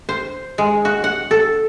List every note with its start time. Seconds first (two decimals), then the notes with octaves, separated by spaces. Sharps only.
0.09 C5
0.58 G#3
0.85 F#4
1.04 F#5
1.31 A4